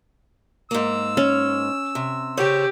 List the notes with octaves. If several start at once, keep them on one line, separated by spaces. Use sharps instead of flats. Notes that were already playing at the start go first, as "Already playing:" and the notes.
G#2 A#3 E6
C#4
C3
C#3 G4 C5 C#5